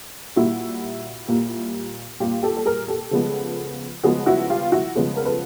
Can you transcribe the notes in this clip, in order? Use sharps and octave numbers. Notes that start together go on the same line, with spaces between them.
A#2 G3 A#3 E4 F#4
A#2 G3 A#3
A#2 G3 A#3 F4 G4
G4 A4
A4
G#4 A#4
G4 A4
C#3 F3 G#3 B3
C#3 F3 G#3 B3 F#4 G#4
E4 F#4
F4 G4
E4 F#4
C#3 F3 G#3 B3
A#4
A4 B4